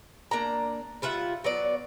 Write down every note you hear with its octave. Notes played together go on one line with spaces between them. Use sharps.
A#3 D4 A#5
G3 F4 E5 F#5
F#3 B3 D5